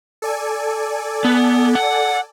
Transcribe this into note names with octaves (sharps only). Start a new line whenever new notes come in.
A4 D5 G#5
B3
F#5